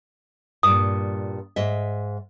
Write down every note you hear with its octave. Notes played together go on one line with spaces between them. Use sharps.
G2 A#2 D#6
G#2 D#5 E5